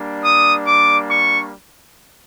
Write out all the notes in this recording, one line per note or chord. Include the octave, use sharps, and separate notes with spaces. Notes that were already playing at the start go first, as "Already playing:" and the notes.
Already playing: G3 A#3 D4
D#6
D6
C#6